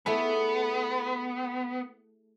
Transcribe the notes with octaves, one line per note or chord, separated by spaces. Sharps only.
A3 B3 E4 G#4